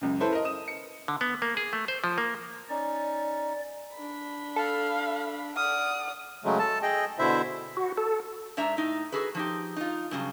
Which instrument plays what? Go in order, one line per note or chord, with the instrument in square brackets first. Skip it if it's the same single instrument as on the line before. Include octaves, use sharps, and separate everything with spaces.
[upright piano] C#2 F#2
C#4 E4 A4 B4 C5
A#4 D#5
D#6 E7
C#7
[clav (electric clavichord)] D3
B3
A#3
G#4
A3
C5
F3
A#3
[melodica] C#4 D#4 [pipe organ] D5
[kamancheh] D4 B5
[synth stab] A4 [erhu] F5
[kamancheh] D5 F#5 [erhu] D#6 [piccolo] F6
[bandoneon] C#3 F#3 G#3 A3
A4 A5
G#4 D#5 G5
B2 D3 E4 C5 E5
[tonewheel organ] F#4
A4
[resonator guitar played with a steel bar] G#2 D4 E5 A#5
A2 D#4
F#4 G#4 A4 B4
F3 D#4 G4
D#4 F4
G2 C#3 F#3